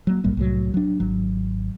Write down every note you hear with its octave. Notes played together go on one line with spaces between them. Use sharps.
F#3 A#3
A#1 G#2 G3 A#3
C2 A2 F#3
F#3 D4
G#1 F#3